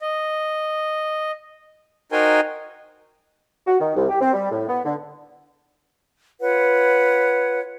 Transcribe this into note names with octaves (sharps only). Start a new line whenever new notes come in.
D#5
D#4 F#4 A#4 C5 G5 G#5
F#4
D#3
C2
G4
C4
G3
A2
B3
D3
F4 B4 C#5 F#5